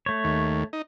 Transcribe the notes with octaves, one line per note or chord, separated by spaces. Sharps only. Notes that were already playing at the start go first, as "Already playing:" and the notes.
A3 C#5
D#2
D#4